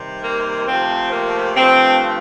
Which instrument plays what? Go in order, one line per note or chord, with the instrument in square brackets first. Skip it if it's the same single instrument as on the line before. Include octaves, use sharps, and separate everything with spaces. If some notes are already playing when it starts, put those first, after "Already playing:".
Already playing: [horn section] C3 D#3 G3
A#3
C3 F3 A3 C4
A#3
G2 F3 A3 C4